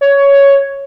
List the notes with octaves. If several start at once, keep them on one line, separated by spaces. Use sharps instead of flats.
C#5